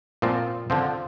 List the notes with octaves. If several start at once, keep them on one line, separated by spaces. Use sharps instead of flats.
A#2 F3 C4 F4
D3 F3 C4